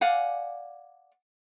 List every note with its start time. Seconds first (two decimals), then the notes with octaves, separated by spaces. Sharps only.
0.01 D5 F5 F#5 G#5